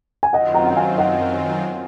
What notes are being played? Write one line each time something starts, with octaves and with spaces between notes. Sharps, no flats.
G#5
F#2 D#3 F#3 C4 F4 D#5 F#5
F#5 A#5
F#5
F5 G#5
D#5 F#5